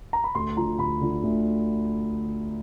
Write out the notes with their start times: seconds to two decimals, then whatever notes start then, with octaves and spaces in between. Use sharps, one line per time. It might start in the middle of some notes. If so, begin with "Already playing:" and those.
0.13 A#5
0.24 B5
0.35 D2 C6
0.57 D3 F3 A#5
0.79 D2 B5
1.01 D3 F3
1.23 D2